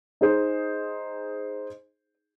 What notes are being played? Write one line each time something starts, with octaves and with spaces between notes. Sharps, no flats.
D#4 G#4 C5